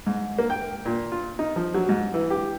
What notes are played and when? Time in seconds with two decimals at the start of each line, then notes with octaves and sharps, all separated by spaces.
0.07 G#2
0.39 A#3
0.50 G5
0.86 A#2
1.12 F4
1.39 D#4
1.56 F3
1.74 F#3
1.89 G#2
2.14 E3
2.30 G4